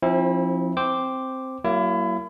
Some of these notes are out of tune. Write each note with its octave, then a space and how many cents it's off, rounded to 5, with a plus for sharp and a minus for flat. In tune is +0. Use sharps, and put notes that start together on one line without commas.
F3 +5 C4 +35 E4 -25
C4 +0 C5 +0 D6 +0
F#3 +35 A#3 +0 E4 +30